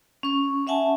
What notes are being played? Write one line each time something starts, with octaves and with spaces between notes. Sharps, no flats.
C#4 C#6
C#4 E5 F#5 G#5 A5